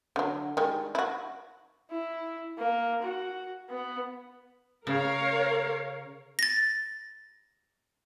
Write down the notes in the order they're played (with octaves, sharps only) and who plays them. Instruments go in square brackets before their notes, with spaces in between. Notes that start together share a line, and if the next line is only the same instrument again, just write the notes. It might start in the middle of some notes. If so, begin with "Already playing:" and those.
[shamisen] D3 F#3
D#3 G3 G#3
E4 F#4
[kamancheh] E4
A#3
F#4
B3
[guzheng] C#3 [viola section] A#4 C#5 F5
[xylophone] A6 A#6